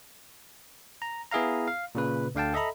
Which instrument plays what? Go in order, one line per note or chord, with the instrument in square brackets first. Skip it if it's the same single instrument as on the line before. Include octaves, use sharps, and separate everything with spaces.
[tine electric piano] A#5
B3 E4 G#4 E5 F5 A#5
F5
A#2 C#3 B4
D2 D3 F5 G5 A5
A4 D#5 E5 A#5 B5